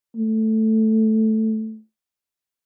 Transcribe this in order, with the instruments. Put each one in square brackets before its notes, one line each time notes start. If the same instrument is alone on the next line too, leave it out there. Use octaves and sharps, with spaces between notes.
[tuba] A3